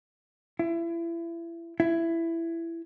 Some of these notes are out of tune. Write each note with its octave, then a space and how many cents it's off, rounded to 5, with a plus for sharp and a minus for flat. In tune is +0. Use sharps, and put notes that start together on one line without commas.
E4 +30
E4 +15